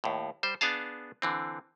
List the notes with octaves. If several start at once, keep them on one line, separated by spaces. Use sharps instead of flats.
D#2 A2
G3 C5
B3 D4 G#4 F5 A5
D3 E3 C4